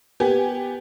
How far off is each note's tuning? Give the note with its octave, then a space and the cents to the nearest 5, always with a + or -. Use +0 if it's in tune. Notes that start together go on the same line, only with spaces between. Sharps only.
B3 +0 G4 +0 G#5 +0